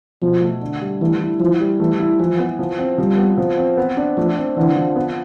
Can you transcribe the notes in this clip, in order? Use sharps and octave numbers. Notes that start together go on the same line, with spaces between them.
B2 F3
A3
D3
G3
E3 A3
E4
E3 F3
G3
E3 A3
E4
E3 F3
B3
F3
C4
F3 G3
B3
F3
C4
B3
D4
F3 A3
C4
D3 E3
F3
B3